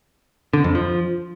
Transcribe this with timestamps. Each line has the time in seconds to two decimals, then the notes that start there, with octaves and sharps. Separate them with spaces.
0.53 D3
0.64 F2
0.75 F3